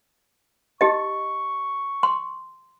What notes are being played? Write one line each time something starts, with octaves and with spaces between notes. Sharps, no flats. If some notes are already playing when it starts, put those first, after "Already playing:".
D#4 G4 D#5 C#6
C6